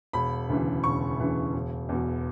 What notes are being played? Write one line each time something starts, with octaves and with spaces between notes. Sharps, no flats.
E1 B5
D2 C#3 E3
E1 C#6
D2 C#3 E3
E1
E2 B2